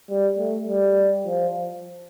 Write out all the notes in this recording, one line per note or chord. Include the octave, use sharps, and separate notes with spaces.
G3
A3
G3
F3